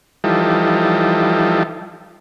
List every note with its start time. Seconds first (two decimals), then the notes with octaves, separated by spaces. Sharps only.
0.24 E3 F3 G3 D#4 A4